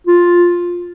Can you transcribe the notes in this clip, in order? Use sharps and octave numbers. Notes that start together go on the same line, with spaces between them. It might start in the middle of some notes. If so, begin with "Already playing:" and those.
F4